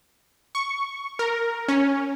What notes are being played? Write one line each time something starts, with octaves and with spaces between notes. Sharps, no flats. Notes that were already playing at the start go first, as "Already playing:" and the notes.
C#6
A#4
C#4